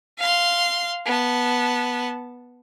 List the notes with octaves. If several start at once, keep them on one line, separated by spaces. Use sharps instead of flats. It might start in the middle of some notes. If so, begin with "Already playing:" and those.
F5 C6
B3 A5